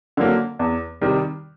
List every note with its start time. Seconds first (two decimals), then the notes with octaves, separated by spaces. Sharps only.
0.17 D3 F#3 A#3
0.59 E2
1.01 C3 D#3 G3